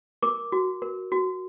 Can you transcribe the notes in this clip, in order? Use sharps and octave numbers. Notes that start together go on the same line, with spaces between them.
A#4 D6
F#4
A#4
F#4